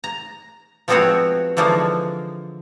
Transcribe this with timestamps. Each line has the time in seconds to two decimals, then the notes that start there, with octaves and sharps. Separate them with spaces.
0.04 A#5
0.88 F3 G#3 B3 C4 F#4 C#5
1.57 D3 E3 F3 G#3 A#3